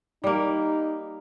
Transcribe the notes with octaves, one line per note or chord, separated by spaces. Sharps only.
G3 A#3 D#4